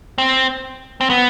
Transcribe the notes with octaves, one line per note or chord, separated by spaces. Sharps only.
C4
C4
B3